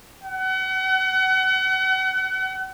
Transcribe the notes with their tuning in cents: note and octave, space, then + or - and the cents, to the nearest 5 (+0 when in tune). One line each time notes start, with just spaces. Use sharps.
F#5 +35